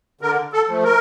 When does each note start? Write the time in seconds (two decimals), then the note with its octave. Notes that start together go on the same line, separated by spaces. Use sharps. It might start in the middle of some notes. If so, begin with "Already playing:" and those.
0.21 D3 A#4
0.53 A4
0.68 F3 A3
0.84 A#4